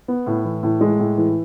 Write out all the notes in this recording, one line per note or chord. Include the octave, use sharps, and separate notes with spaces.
B3
A2
E3
A2
G#3
A2
E3